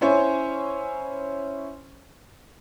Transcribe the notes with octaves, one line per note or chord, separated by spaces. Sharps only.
C#4 E4 C5 C#5 G#5